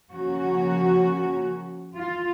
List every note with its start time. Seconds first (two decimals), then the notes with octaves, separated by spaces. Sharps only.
0.12 C#3 F3 A#3 C#4 F#4
1.98 F4